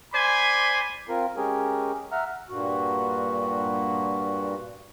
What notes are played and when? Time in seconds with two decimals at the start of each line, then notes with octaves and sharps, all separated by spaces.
0.13 C5 D5 G#5 B5 C6
1.09 C4 F4 A#4
1.36 G#3 C#4 G4 G#4 A#4 C#5
2.12 E5 F#5 A#5 F6
2.49 G2 A#2 F#4